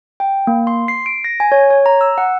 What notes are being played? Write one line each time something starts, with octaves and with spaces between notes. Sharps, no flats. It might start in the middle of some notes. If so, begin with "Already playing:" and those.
G5
A#3
C6
C7
D7
A#6
G#5
C#5
C#5
A#5
E6
F#5